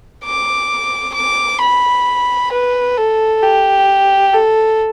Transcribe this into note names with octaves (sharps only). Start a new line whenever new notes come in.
D6
D6
B5
B4
A4
G4
A4